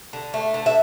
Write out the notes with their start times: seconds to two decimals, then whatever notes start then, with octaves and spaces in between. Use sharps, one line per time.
0.13 D3
0.34 A3
0.54 D3
0.66 E5